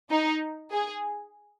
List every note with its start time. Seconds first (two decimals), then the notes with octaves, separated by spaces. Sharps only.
0.10 D#4
0.72 G#4